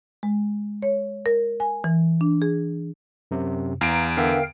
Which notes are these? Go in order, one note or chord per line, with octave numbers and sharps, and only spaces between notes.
G#3
C#5
A#4
G#5
E3
D4
G#4
F#2 C3
E2 F5 A#5 D7
D3 B3 A#4 E5 F5 G5